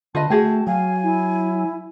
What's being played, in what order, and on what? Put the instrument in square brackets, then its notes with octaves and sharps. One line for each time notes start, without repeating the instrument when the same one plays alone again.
[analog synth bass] D3 [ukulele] F4 B4 D#5 [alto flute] A5
[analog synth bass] A3 [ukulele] F#4 G#4 G5
[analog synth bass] F#3 [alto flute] F5 [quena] G#5
[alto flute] E4